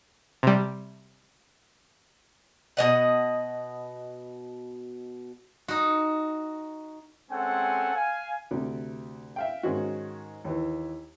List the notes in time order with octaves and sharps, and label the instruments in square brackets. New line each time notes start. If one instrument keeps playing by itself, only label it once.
[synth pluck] C3 G3
[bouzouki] B2 A#3 D#5 F#5
[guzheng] D#4 F#4
[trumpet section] G#3 C4 C#4 A4 F#5 G#5
F5 G#5
[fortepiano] D2 C3
E5 F5 G5
G#2 D#3 G#3 C#4 D#4 F#4
D#2 E3